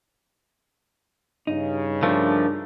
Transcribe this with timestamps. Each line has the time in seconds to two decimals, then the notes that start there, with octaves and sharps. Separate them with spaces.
1.47 G2 C#3 D#4
2.03 F3 A3 D4 A#4